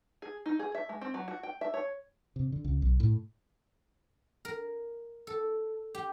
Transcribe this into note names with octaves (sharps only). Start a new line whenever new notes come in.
G#4
D#4
G#4
E5
G#3
C4
F#3
F#4
G5
E5
C#5
C3
D3
C#2
B1
A2
A#4
A4
G4